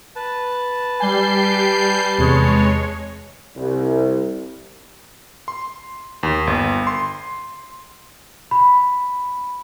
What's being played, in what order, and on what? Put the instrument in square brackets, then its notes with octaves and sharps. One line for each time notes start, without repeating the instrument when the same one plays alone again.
[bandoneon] B4 A5
[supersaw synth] G3 G6 C7 [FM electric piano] G#5
[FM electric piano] E2 C3 E3 [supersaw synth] G#3 C#5
[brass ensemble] C2
[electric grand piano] C6
D#2
G1
C6
[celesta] B5